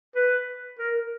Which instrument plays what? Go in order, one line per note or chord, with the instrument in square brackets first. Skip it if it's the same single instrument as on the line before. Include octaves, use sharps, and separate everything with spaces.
[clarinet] B4
A#4